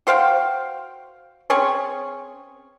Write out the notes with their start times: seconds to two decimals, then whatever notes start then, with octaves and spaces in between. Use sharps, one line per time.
0.07 F#4 C5 F5 G5
1.50 C4 C#4 G#4 C#5